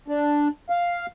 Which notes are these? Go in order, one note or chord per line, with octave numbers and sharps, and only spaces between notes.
D4
F5